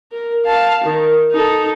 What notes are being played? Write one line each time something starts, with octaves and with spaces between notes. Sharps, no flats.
A#4
F5 A5
D#3
D#4 A4